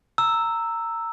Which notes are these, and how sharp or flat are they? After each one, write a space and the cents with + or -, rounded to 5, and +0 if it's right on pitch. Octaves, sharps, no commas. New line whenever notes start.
A#5 -20 E6 +0